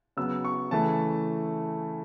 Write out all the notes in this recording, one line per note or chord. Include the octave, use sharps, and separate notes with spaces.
C#3 F#3 B3 E6
C#6
C#3 E3 A3 A5